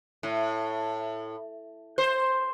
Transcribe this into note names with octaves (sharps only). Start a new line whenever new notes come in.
A2
C5